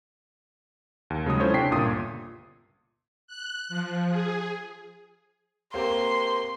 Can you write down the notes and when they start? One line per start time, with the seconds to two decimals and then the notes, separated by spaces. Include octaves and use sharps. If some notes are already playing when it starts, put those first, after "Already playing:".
1.10 D#2
1.26 C#3 F#3 G#3 D#6
1.40 C#4 E4 F4 A4 C5 C#5
1.53 C3 D4 G5 B6 C7
1.70 G1 C#2 A#2 D#6
3.27 F#6
3.69 F3
4.09 G#4
5.74 A#3 C4 G4 C6